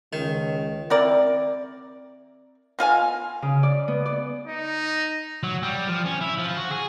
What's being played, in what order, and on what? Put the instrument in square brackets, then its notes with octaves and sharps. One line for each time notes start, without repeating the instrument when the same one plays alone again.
[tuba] C#2 [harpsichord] D#3
[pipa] C4 E4 A#4 D5
B2 F4 F5 G#5
[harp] C#3
D5
B3
D5
[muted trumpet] D#4
[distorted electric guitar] F#3
G3
F3
C#4
E4
F3
F#4
G#4